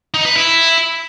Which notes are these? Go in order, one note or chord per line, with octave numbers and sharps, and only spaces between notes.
D#4
B4
E4